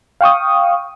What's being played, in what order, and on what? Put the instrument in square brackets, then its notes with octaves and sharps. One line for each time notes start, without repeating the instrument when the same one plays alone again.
[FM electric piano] F5 G5 C#6 D#6